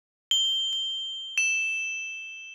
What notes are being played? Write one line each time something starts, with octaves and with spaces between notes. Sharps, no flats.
G7
G7
E7